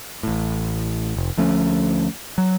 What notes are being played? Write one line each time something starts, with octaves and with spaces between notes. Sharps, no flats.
A1 A2
F1
D2 F3 A3 C#4
F#3